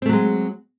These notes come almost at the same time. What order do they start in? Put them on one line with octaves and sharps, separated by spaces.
C4 A3 F#3 G#3